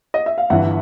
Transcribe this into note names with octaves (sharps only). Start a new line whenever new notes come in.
D#5
E5
F5
G1 G2 E3 E5 F#5